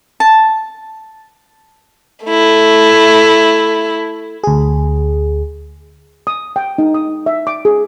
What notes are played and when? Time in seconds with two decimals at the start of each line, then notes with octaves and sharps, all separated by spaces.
0.20 A5
2.25 A3 E4
4.44 D2 G#4
6.27 D#6
6.56 G5
6.78 D#4
6.94 D#6
7.26 E5
7.47 D6
7.65 G#4